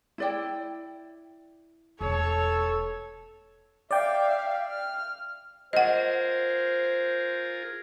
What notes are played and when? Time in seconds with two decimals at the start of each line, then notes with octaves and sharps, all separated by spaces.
0.18 E4 D5 G5
2.01 E1 A3 A4 C#5
3.91 D5 E5 F5 G5
4.71 F6
5.73 F4 G#4 A#4 C5 D#5 F#5